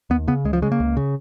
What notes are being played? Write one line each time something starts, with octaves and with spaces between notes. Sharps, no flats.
D#2 B3
C#3 B3
C#2 G#3
F3
C#3 G#3
A#3
C#2
C#3